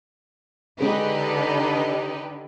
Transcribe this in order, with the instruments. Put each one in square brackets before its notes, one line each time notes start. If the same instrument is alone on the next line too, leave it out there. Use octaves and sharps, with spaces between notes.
[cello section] D3 [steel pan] G#3 C#4 G#4 [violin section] D#4 G4 B4